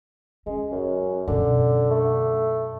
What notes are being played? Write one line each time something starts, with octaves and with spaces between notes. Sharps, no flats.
G#3 C#4
F#2
F#2 B2 D3
A3